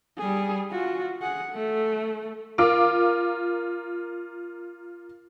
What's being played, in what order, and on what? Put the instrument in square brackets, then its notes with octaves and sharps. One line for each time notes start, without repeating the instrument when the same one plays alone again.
[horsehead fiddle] G3 G#4
F4 F#4
G#4 F#5
A3
[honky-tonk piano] F4 A#4 D6